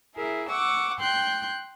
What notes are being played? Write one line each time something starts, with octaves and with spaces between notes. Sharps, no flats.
E4 G#4 A#4 E5
F#5 C#6 D6 E6
G5 C6 F#6 G6